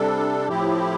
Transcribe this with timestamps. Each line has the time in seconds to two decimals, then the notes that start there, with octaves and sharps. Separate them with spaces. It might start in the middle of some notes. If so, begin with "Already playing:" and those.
Already playing: C3 G3 D4 A4
0.49 A2 F3 C4 E4 G4